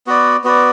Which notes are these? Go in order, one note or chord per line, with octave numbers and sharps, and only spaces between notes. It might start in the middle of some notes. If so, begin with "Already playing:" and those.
B3 F#4 B4 D5
B3 F#4 B4 D5